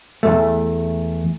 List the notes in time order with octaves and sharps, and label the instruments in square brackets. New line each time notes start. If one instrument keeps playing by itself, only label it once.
[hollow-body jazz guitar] E2 G#2 A3